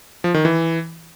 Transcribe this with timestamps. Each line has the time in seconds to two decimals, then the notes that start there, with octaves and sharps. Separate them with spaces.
0.24 F3
0.34 D#3
0.45 E3